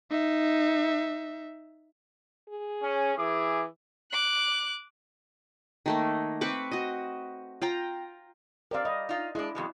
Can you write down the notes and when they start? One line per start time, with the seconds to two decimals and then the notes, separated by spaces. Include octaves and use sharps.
0.11 D#4 E5
2.49 G#4
2.82 C#4
3.18 E3 E4 G#4 D6
4.12 D6 F#6
5.86 D#3 A3 A#3
6.41 C4 B4 C#6 D6
6.71 F#4 D#5
7.62 F4 G5 A#5
8.71 C4 G4 A#4 D5 F5
8.85 G3 D#5
9.09 D#4 F4
9.35 G#3 D4 E4
9.55 F2 B2 G#3